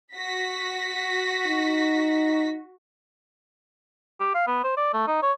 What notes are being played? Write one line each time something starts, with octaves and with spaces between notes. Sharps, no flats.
F#4 A#6 B6
D#4
G4
F5
B3
C5
D5
A3
D#4
C#5